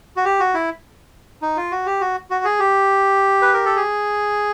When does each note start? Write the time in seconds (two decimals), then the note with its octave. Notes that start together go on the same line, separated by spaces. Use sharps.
0.16 F#4
0.25 G4
0.40 F#4
0.54 E4
1.42 D#4
1.57 F4
1.71 F#4
1.86 G4
2.01 F#4
2.30 F#4
2.45 G#4
2.59 G4
3.42 B4
3.53 A#4
3.65 A4
3.76 G#4